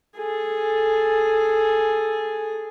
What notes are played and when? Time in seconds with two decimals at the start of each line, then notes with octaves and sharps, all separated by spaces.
0.17 G#4 A4